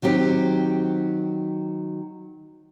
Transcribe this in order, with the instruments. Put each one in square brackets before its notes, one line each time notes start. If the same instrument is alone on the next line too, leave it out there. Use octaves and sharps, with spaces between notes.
[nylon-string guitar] D#3 F#3 C4 G4